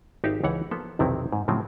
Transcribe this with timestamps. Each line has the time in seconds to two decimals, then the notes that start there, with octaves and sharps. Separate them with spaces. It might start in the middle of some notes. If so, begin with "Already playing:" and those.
0.24 G#1 D#4 G4 D5 E5 F5
0.44 C#2 E3 C#5 F#5
0.71 F3 A#3 B3 A4
0.99 B1 F2 C3 D#3 C4 E4
1.33 G#2
1.48 A2 C#3 F3 F#3 C4